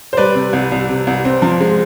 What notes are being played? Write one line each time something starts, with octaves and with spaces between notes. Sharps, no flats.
C5
G3 B4 D5
C3
C2
C2
C3
C2
C4
F3
G#3